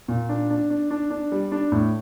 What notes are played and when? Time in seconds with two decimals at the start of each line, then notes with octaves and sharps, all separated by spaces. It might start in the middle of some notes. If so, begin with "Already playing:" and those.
0.08 A#2
0.29 D4
0.50 D4
0.70 D4
0.91 D4
1.10 D4
1.32 G3
1.52 D4
1.72 A2